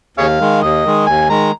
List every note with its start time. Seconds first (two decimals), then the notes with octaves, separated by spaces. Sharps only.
0.17 D#2 G#4 C#5 F5
0.40 D#3 G#3
0.62 D#2 D#5
0.85 D#3 G#3
1.07 D#2 G#5
1.29 D#3 G#3 A#5